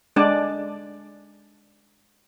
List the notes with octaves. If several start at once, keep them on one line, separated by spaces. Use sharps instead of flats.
G#3 D4 D5